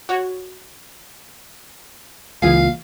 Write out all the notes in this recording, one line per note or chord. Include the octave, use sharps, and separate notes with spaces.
F#4 C#5
C#2 A#2 E3 G#4 F5